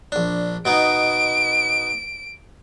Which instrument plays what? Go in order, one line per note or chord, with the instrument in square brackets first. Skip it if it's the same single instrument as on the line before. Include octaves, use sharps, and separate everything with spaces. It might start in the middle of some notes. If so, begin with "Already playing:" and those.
[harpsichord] A#1 D4
[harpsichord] B2 B3 D#4 [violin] D7